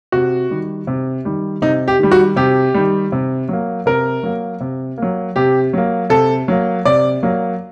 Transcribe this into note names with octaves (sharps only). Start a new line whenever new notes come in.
C3 F#4
D#3 G3
C3
D#3 G3
C3 D#4
G4
D#3 G3
F#4
C3 G4
D#3 G3
C3
F#3 A#3
C3 A#4
F#3 A#3
C3
F#3 A#3
C3 G4
F#3 A#3
C3 A4
F#3 A#3
C3 D5
F#3 A#3